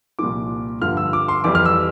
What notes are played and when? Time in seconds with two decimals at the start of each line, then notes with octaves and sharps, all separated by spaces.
0.19 C2 A#2 F3 D6
0.82 G2 D3 F3 F6
0.97 E6
1.13 D6
1.28 C6
1.44 F2 E3 G3 D6
1.55 F6
1.65 E6